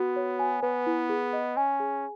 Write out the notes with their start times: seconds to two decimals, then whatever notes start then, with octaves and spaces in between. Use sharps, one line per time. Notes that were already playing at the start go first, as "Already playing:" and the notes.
Already playing: B3 F#4
0.16 C#5
0.39 G#5
0.63 B3 B4
0.87 E4
1.09 G#4
1.33 D#5
1.57 C#4 G#5
1.80 G#4